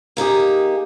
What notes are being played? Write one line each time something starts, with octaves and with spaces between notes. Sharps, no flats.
A#3 D#4 G4 G#4